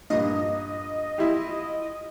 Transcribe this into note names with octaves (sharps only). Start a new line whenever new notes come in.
G2 A#2 D#5
E4 F4 G4